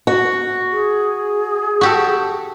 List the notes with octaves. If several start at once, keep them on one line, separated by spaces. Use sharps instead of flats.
F#4
G#4
F#4 G4 A4